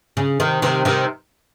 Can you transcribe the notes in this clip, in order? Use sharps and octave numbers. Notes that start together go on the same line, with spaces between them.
C#3
C3 D#3
C3 D#3
C3 D#3